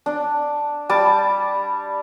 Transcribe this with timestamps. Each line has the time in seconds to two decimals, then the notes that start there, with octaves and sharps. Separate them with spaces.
0.06 D4
0.89 G3 A5 D6